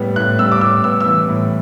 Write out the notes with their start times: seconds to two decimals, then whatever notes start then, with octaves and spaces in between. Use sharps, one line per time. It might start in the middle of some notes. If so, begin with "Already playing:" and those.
Already playing: A2 G3 B3
0.16 A2 F#6
0.39 G3 E6
0.52 D6
0.61 A2 E6
0.84 B3 E6
1.01 E6
1.06 E3
1.29 A2